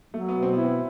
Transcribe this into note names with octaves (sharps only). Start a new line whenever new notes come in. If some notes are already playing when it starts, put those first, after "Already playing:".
F#3 A3
B3
B2
C4
B3 E4
C4